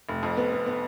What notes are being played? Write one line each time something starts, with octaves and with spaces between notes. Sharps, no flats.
F1
F2
B3
B3
B3